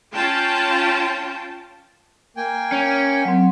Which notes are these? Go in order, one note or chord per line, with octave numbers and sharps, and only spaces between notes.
C#4 F4 G5 A5
A#3 G5 G#5
C#4
F#3 C4